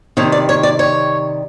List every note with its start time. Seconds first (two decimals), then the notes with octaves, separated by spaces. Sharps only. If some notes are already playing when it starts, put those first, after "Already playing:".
0.17 C3 D#3 G3 C#5
0.32 D5
0.49 C#5
0.63 D5
0.79 C#5